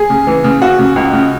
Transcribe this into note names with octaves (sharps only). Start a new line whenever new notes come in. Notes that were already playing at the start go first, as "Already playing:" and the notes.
Already playing: G#4
C#3
E3
C#3
C#3 F#4
C#3
C#2
C#3